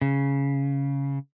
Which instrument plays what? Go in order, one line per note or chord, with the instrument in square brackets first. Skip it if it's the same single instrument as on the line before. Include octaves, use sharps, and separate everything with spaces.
[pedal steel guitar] C#3